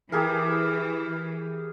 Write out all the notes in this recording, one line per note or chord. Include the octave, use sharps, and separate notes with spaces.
E3 G4 G#4 A#4